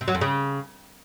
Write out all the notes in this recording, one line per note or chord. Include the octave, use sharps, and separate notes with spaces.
C3
F#3
F2
C#3